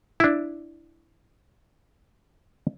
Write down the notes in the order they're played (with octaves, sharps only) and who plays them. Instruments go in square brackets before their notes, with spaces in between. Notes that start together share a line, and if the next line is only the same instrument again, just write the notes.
[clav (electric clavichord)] D4 E4